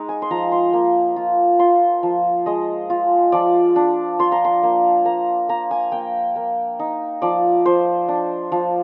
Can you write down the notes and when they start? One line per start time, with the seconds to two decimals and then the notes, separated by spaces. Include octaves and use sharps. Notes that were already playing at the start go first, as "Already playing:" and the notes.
Already playing: G#3 D#4
0.09 G#5
0.22 C6
0.31 F3 A#5
0.52 C6
0.73 A#3
1.16 F4
1.59 F4 C6
2.03 F3
2.46 G#3 D#5
2.90 F4
3.32 F3 D5
3.76 D4
4.19 F4 C6
4.32 A#5
4.45 C6
4.63 A#3
5.05 A#3 A#5
5.49 A#3 A#5
5.71 G#5
5.92 A#3 G5
6.36 A#3
6.79 D#4
7.22 F3 D5
7.65 F3 C5
8.08 D4
8.52 F3